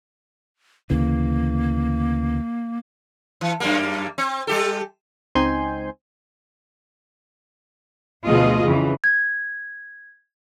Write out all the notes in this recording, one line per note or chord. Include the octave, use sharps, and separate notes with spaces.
D2 C#3 E3 A#3
E3
F#2 G3 A#3
C4
G3 G4 A4
C#2 C4 D#4 G#5 C6 G6
D2 B2 F3 F4 G#4 D#5
F2 C#3 E3
G#6